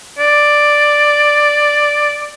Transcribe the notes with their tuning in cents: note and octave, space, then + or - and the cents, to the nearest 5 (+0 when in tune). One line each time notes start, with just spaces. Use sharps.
D5 +5